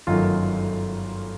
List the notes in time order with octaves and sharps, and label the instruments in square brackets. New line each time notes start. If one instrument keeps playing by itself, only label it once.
[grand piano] G1 F#2 D#3 F#3 A3 F4